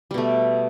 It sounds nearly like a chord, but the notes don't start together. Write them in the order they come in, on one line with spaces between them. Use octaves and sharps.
G3 B2 A3